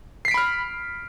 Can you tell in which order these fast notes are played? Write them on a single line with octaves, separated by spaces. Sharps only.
C7 B6 D7 B5 F6